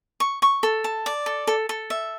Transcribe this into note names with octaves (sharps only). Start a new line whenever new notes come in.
C#6
C#6
A4
A5
D5
A4
A4
A4
E5